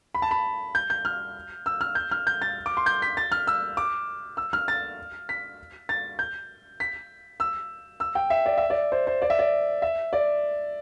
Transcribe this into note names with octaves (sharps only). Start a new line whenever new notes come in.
B5
A5
B5
G6
G6
F6
E6
F6
G6
F6
G6
A6
D6
C6
G6
B6
A6
F6
E6
D6
E6
F6
A6
B6
A6
G6
B6
E6
E6
G5
E5
D5
E5
D5
C5
C5
D5
E5
D5
E5
D5